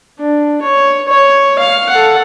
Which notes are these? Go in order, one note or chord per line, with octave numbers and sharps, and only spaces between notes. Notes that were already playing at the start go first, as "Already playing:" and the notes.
D4
C#5
C#5
F5
A4 F#5